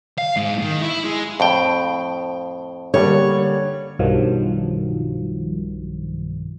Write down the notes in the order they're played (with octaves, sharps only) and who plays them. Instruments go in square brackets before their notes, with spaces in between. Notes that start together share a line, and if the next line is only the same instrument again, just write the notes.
[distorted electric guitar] F5
G#2
D#3
E4
G#3
[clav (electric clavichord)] F2 A2 G5
[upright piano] D3 G3 A#3 [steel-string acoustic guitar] C#5
[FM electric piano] B1 G2 D#3 F3 F#3